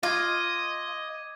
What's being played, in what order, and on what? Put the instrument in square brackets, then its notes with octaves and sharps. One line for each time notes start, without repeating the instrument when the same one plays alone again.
[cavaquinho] F4 [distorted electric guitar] D#5 [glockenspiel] D6 G#6